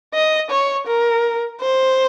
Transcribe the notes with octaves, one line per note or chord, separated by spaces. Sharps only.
D#5
C#5
A#4
C5